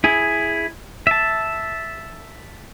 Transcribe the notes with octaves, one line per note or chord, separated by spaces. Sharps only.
E4 G#4
E5 A5